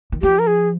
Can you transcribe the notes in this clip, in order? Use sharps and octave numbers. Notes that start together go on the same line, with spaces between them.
D#3
F3 G4
A#4
G#4